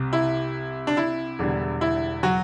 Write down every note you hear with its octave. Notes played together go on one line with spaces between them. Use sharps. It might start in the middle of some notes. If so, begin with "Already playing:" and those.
Already playing: C2 C3
E4
D4
E4
E1 E2 D3 G3
E4
F#3 F#4